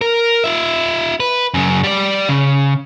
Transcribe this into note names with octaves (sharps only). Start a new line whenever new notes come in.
A#4
F4 E5
B4
F#2 C#3
G3 D5
C#3